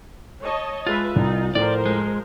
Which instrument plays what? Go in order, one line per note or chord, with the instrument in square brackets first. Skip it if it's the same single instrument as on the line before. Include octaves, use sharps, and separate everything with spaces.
[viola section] C#5 D#5 A5
[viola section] G#3 B4 E5 [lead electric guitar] F4
[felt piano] C2 [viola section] D#4
[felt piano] A2 [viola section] F3 A#4 C5 [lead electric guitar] D5
[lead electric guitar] G#3